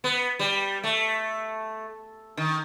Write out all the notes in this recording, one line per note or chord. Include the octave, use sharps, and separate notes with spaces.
B3
G3
A3
D#3